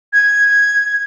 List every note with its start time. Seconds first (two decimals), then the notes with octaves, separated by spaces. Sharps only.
0.13 G#6